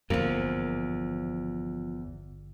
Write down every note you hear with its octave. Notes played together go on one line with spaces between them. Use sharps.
G#1 E2 G2 D3 F3 A#3